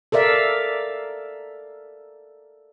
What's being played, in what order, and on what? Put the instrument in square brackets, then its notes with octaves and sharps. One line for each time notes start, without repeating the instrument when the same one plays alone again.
[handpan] A4 A#4 D5 E5 F5